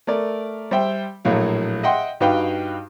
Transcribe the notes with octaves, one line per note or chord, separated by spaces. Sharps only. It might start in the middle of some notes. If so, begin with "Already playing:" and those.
A3 A#4 D5
G3 C5 E5 G5
A#1 A2 F#3 F5
D#5 E5 F#5 G5 C6
G2 D#4 F#4 B4 F5 G5